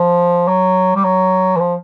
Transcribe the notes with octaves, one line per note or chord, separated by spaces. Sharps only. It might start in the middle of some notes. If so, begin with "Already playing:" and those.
Already playing: F3
F#3
G3
F#3
E3
F3